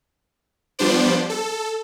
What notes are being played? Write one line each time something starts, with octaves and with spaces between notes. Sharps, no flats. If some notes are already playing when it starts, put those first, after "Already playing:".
F3 G3 B3 D4 C5 D5
A4